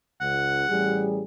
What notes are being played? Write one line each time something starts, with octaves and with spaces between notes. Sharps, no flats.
C#2 F#5
A1 G3 G#4